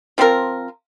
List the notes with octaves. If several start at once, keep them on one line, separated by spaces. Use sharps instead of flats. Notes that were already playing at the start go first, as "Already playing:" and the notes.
F3 C4 F4 A#4